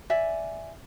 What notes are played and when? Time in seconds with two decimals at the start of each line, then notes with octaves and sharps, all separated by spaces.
0.10 D5 E5 G#5